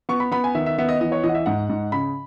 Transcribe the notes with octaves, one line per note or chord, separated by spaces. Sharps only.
B3 C#6
B5
B3 B5
G#5
D#3 E5
E5
B3 E5
D#5
E3 D#5
C#5
E3 D#5
F#5
E5
G#2 F#5
G#2
C#3 B5